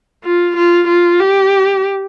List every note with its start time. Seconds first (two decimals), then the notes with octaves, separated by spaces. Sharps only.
0.24 F4
0.56 F4
0.87 F4
1.19 G4